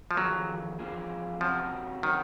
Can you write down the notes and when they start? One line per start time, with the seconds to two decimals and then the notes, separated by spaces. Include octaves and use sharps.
0.11 F3
0.17 F2 D#3 F#3 A#3 F4 G#4
0.79 F2 D#3 A#3 F4 G#4
1.40 C3 F3 F#3 C#4 F#4
2.03 C3 D#3 F#3 C#4 F#4